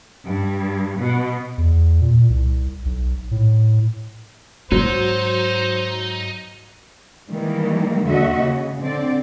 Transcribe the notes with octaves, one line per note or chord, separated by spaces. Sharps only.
G2
B2
E2
A#2
C2
B1
A2
G#2 F#3 D#4 C5
D#3 E3 G3 G#3 A#3
D#2 D3 F#4 D#5 E5
C#3
D3 C4 D5